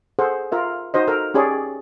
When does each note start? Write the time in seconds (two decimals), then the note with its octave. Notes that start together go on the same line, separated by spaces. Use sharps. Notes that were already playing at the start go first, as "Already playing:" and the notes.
0.19 G#4 A4 C5 F#5
0.52 F4 A#4 E5
0.94 D#4 F#4 C5 D#5
1.08 A4 A#4
1.34 C#4 G4 G#4 C#5 D5